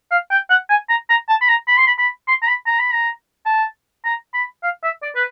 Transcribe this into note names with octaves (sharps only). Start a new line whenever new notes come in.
F5
G5
F#5
G#5
A#5
A#5
A5
B5
A#5
B5
C6
B5
B5
C6
A#5
B5
A#5
B5
A#5
A5
A#5
B5
F5
E5
D5
B4